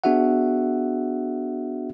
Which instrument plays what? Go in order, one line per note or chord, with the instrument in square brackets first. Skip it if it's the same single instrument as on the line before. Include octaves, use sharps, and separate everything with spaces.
[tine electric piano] B3 D4 F#4 G#4 E5 F#5